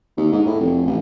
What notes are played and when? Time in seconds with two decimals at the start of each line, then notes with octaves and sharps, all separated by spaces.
0.17 D#2
0.32 G#2
0.46 A2
0.60 F1
0.86 A1